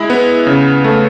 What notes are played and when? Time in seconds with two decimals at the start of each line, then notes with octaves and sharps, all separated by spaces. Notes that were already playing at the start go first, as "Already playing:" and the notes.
Already playing: G#3 E4
0.10 B3
0.47 C#3
0.84 A3